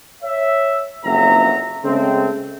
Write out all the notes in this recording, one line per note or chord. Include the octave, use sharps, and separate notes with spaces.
C#5 E5
F#1 B1 F2 F#3 E5 A#5
C#3 G#3 A3 C4